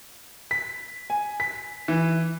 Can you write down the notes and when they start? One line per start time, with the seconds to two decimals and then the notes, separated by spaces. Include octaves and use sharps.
0.51 B6
1.10 G#5
1.40 B6
1.88 E3